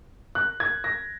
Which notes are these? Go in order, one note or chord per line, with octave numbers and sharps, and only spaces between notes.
F#6
G#6
A#6